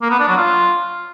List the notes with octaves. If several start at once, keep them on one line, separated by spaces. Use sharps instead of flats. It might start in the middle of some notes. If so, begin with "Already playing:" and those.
A#3
B3
D4
F#3
F4